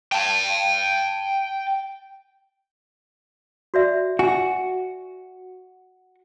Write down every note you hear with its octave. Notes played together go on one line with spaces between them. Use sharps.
G5 A5
F#4 D5 E5
F#4 G#5